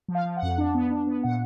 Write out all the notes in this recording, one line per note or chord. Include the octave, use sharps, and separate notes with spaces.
F3
F5
F3
F#5
F2
D4
B3
D4
B3
A#2 F#5